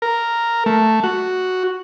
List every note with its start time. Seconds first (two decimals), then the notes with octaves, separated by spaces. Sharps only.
0.02 A#4
0.66 A3
1.04 F#4